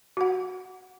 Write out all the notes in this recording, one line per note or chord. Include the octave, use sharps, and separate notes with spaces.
F#4 F#5